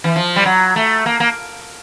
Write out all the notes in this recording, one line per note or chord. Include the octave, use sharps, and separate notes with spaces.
E3
F3
G3
F#3
A3
A#3
A#3